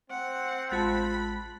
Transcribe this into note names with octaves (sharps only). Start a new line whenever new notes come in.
C4 F#5
A1 G#3 F4 A5 B5 F#6 A6